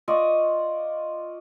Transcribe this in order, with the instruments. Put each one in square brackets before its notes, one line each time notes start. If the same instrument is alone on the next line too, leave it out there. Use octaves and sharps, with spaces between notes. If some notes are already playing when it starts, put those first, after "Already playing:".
[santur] F4 D5 D#5 C#6